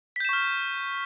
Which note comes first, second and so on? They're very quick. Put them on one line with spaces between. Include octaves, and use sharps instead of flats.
B6 G6 E7 C#6 F6